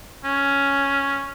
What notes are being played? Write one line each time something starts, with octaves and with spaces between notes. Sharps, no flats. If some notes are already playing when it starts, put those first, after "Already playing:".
C#4